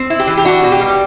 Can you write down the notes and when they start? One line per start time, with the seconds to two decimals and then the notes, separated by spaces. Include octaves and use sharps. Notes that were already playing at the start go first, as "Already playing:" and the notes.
Already playing: C4
0.10 E4
0.19 G4
0.27 E3
0.37 G4
0.45 D4 F#4
0.63 B2
0.72 G4
0.81 G3